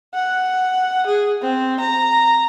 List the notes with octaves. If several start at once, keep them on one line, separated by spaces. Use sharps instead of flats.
F#5
G#4
C4
A#5